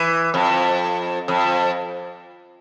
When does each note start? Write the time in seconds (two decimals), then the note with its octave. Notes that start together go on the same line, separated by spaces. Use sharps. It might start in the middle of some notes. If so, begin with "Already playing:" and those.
Already playing: E3
0.34 F2
1.28 F2